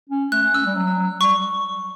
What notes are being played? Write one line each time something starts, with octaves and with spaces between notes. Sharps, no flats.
C#4
A3 F#6
A3
C#4 E6
G3
F#3
G3 C#6